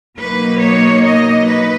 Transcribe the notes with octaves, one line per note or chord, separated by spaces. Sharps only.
B2 F#3 A#3 D#4 B4
C#5
D#5
B4